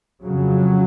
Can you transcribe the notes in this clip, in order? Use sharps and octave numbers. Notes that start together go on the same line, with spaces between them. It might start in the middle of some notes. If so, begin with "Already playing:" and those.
F2 C#3 F#3